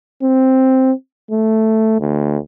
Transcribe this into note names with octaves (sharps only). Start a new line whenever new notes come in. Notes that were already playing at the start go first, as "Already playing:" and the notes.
C4
A3
D2